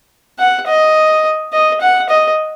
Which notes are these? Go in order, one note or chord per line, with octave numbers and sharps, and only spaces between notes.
F#5
D#5
D#5
F#5
D#5